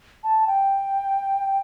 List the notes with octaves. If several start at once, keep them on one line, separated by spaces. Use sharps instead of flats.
A5
G5